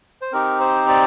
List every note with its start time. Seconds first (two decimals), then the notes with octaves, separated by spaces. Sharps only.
0.22 C5
0.32 C4 D#4 G4 A#4
0.60 C5
0.89 D5